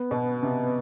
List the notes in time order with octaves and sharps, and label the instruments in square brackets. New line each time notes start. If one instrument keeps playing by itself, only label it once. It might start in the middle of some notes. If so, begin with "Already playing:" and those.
Already playing: [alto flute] B3
[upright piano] B2
C3